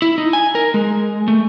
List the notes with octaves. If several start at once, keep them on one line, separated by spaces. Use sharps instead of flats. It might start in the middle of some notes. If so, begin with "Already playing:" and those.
E4
D#4
G#5
A#4
G#3
A3